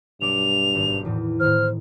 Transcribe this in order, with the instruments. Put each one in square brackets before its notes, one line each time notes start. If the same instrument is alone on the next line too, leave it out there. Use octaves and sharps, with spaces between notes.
[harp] B1 D6 [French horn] G2 [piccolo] F7
[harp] G#1
E2 A2
[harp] A2 D#3 [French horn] C5 [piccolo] F6